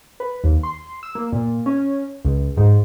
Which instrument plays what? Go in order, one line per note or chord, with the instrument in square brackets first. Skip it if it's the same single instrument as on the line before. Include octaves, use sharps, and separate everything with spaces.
[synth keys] B4
D#2
C6
E6
A#3
A#2
C#4
C#2
G#2